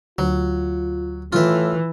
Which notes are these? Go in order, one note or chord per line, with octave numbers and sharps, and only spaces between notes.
D2 F#3 F4
A2 E3 F4 E5